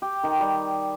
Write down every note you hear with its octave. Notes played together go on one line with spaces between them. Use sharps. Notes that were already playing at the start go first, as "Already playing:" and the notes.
G4
D#3
G3